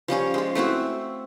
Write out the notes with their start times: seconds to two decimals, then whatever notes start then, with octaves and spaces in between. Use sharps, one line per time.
0.08 F3 G3 C#4 C#5
0.34 G#3 F4
0.55 A3 C4 E4 F#4